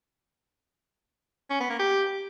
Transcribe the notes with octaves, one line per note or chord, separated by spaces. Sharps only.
C#4
B3
A#3
G4